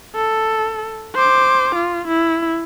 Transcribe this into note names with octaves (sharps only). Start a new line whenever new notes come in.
A4
C5 D6
F4
E4